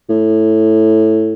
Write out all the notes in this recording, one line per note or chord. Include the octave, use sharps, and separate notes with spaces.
A2